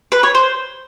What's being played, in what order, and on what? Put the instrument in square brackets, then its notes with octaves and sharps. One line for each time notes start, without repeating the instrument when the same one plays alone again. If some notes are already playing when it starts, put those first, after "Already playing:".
[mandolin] B4
C#5
C5